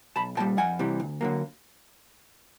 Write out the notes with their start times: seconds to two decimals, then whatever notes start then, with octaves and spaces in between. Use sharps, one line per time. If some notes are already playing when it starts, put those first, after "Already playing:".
0.16 B1 A5 B5
0.37 A#2 G5 A5
0.40 G3
0.57 F2 F#5 G#5
0.79 C3 E3 G3
1.00 D2
1.21 D3 F#3 A#3